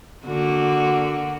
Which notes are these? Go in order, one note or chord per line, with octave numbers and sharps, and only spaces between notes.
D3 A#3 F#4